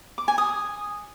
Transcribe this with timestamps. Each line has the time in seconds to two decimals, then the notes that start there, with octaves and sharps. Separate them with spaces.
0.18 D6
0.28 G#5
0.38 D#6